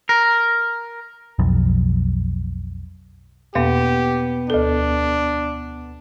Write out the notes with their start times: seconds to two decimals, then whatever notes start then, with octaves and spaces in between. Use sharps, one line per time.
0.09 A#4
1.39 B1 F2
3.55 E2 B2 A#3 B3 G4
4.50 D2 D4 A4